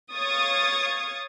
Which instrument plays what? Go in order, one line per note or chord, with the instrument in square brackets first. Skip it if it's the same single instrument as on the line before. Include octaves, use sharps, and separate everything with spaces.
[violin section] C#5 F5 C#6 D#6 G#6 A6